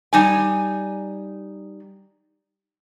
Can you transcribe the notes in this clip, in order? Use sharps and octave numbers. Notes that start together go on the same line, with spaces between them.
G3 D#4 G#5